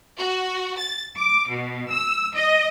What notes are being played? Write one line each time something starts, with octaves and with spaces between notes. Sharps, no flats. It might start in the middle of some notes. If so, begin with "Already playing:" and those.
F#4
A6
D6
B2
E6
D#5